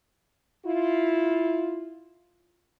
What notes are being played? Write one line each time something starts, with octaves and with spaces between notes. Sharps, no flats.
E4 F4